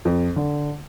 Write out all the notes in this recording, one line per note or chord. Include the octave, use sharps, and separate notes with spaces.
F2
D3